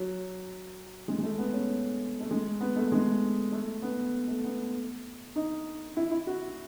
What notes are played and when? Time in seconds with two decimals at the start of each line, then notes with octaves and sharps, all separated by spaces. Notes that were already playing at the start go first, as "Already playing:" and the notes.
Already playing: F#3
1.08 G#3
1.19 G#3
1.23 A3
1.38 B3
1.53 C#4
2.20 A3
2.31 G#3
2.61 B3
2.76 A3
2.92 G#3
3.52 A3
3.82 B3
4.28 A3
4.44 B3
5.36 D#4
5.97 E4
6.11 E4
6.27 F#4